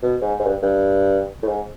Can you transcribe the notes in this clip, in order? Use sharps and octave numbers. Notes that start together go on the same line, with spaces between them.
B2
G#2
G#2
G2
G2
A2
G#2